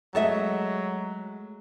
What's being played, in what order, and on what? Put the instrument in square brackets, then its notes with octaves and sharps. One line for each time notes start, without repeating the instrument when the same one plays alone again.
[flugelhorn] F#3 [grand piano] G#3 A3 [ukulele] A4 D#5 E5